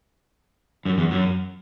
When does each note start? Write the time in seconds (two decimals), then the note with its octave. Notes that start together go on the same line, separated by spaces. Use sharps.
0.85 F#2
0.98 E2
1.11 F#2